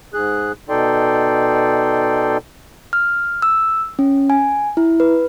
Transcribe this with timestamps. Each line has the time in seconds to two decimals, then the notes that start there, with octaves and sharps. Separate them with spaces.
0.14 G#2 G#4 F#6
0.69 B2 D#4 A4 D5 G5 C6
2.93 F6
3.42 E6
3.99 C#4
4.30 G#5
4.77 E4
5.00 B4